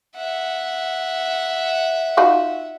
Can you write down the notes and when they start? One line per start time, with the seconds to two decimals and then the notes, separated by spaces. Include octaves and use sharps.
0.16 E5 F#5
2.17 D#4 F4 F#4